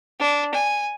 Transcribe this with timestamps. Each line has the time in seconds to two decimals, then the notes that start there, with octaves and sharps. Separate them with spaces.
0.20 D4
0.54 G#5